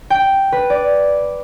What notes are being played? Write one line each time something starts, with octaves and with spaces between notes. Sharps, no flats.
G5
B4
D5